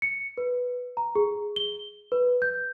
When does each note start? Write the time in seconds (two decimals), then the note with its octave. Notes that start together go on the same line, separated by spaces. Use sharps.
0.02 C#7
0.38 B4
0.97 A#5
1.15 G#4
1.56 G7
2.12 B4
2.42 G6